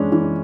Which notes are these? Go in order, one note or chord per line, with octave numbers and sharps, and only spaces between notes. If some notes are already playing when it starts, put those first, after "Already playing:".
Already playing: E3 G#3 C#4 D4
E3